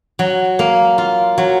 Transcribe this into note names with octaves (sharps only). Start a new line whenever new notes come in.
F#3
A#3
F4
F#3